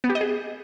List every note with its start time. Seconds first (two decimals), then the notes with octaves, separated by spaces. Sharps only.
0.04 B3
0.10 G4
0.15 D#5
0.21 G#4